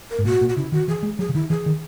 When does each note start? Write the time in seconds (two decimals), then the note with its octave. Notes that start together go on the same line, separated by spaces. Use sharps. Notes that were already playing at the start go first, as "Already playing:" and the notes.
0.10 A#4
0.19 G#2
0.25 A#2 F#4
0.41 A#2
0.49 F#4
0.57 C#3 E4
0.72 D#3 F#4
0.88 E3 G#4
1.03 G#3
1.19 F#3 G#4
1.29 C#3
1.34 D#3 E4
1.50 E3 G#4
1.66 D#3